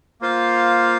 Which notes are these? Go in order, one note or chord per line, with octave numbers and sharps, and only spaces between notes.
A#3 F4 C5 F5